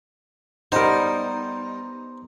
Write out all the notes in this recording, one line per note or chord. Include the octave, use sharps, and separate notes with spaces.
G3 B3 D#4 A#4 C5